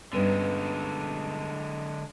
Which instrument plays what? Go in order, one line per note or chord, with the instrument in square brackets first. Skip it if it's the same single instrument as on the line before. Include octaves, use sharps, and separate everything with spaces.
[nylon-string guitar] G2 B3 C#4 [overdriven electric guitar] D3 G#3